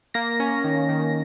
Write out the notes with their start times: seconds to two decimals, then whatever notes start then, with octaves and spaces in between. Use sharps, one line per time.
0.14 A#3 A#6
0.40 C#4
0.64 D#3
0.89 D#3